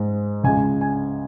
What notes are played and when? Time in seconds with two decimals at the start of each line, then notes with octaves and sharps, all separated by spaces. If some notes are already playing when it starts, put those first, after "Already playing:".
Already playing: G#2 G#3
0.44 C#2 C#3 G#3 G#5
0.81 G#5